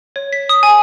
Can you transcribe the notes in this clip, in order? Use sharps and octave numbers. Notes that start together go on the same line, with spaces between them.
C#5
B6
D#6
G#5